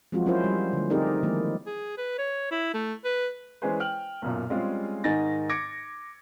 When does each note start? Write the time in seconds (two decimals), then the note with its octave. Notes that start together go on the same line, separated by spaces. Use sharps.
0.12 F3 F#3 G#3 C4 F4 F#4
0.26 F#3 C#4 E4 F4 A#4 C5
0.44 G3
0.73 D3 A3
0.90 C4 D#4 G4 G#4 A#4 D5
1.23 D#3 F3 G#3 A#3 E4
1.66 G#4
1.97 B4
2.18 C#5
2.51 E4
2.74 A3
3.04 B4
3.62 E3 G#3 C#4 G#4 B4 C5
3.80 G5 F6 F#7
4.22 B1 F#2 A#2
4.50 G3 G#3 C4 C#4 F4 G#4
5.04 G#2 D#3 D#4 G#5 A6 A#6
5.49 D6 G#6 A#6 C#7 D7